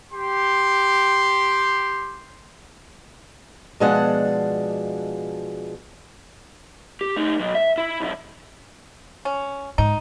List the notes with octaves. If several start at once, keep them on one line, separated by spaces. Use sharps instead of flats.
G4 C6
B2 F3 G#3 D4 F#5
G4
A3 D#4
B2 F#3
E5
E4
B1 E4
C#4
G#2 D#4